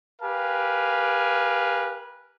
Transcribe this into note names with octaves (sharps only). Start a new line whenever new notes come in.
G4 A#4 B4 F5 G#5